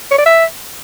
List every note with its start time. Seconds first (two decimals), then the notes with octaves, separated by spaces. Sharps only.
0.11 C#5
0.18 D5
0.26 E5